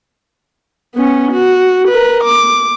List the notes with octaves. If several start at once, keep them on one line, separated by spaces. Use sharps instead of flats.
B3 C#4
F#4
A#4 B4
D6